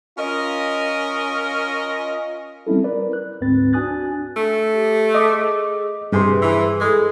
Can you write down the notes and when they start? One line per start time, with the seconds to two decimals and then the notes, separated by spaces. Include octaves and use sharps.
0.18 C#4 F4 A#4 D#5
2.67 G3 C4 C#4 E4 A4
2.84 A#4 B4 D5
3.13 F#6
3.41 D2 G#2 C4 B4 A6
3.73 D4 F#4 G#5 D#6 F#6 A6
4.36 A3
4.72 G4
5.14 G#4 D#5 D6
6.12 G2 C3 G#4 B4 C6
6.42 E3
6.80 G#3 A4